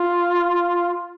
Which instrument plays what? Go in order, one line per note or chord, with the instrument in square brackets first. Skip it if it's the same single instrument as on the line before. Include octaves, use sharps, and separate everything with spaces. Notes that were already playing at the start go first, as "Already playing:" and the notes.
Already playing: [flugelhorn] F4